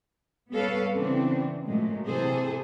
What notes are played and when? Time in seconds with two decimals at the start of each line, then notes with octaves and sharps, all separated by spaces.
0.52 G3 B3 A4 B4 C#5 F5
0.95 C#3 E3 B3 C4 D4
1.65 A#2 F#3 G#3 A3
2.06 C3 E3 G#4 A4 C5